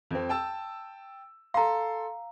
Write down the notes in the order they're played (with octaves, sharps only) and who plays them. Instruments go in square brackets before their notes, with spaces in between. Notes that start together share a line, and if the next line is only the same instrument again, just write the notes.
[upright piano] F2 C4
G5 A5 E6
[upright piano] A4 C6 [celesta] F5 A#5